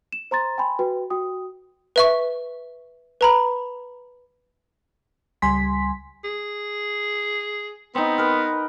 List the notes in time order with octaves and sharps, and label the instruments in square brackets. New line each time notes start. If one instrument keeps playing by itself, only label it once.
[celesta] E7
C5 A#5 C6 A6
G5 G#5 B5 C6
F#4 B4 G5
F#4 G5 D#6
[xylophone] B4 E5 C#6
B4 A#5 B5
[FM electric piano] C#2 G3 G#5 C6 B6
[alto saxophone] G#4
[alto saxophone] B3 [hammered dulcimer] C4 D#4
[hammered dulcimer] A#4 B4